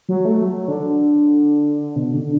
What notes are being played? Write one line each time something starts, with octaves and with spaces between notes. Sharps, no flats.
F#3
A3
F#3
D3
B2
D3